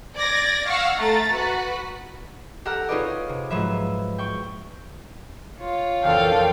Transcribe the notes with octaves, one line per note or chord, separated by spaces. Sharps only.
D5 G#6 A#6
F5 F#5 C#6 E6
A3 A#5 A6
F#4 B4
G4 A4 F#5 A#5 F6 F#6
C#4 D#4 F4 G#4 B4 D5
C3
G#2 F3 F#3 B4 E5
G5 C#6
F4 C#5
A#1 F2 E3 A4 F5 G5